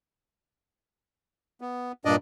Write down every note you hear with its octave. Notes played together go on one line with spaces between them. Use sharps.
B3
G2 A#2 D4 D5 D#5